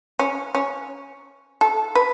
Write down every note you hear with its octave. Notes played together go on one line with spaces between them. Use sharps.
C#4
C#4
A4
B4